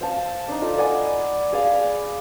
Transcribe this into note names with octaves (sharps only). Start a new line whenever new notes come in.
C5 F5 A5
D4 D#4
F4 A4 D#5
D5 F#5 G#5 B5
G#4 D5 F5
B5